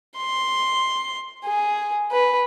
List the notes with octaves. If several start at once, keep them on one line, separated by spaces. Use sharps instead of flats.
C6
G#4
B4